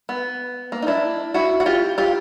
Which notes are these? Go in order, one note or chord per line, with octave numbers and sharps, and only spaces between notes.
B3
A#3
D#4
D4 E4
E4 F#4
F#4
F4 G4
F4 G4